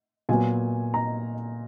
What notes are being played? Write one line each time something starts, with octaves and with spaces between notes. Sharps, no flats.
A#2 F#3 B3 G#5
A#5